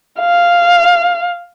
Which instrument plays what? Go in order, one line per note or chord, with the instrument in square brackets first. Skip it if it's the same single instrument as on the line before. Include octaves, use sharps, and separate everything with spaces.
[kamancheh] F5